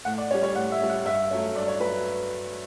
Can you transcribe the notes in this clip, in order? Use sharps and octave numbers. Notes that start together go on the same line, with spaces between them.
A2 F#5
D5
G3 C#4 C#5
C#5
A2 F#5
E5
G3 C#4
F#5
G2 E5
F#3 A3 C#4
G2 D5
C#5
F#3 B4